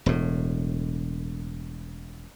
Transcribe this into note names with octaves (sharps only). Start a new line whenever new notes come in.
E1 A2